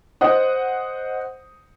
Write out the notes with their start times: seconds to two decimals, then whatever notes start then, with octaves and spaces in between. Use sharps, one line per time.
0.21 C5 D#5 F#5 D#6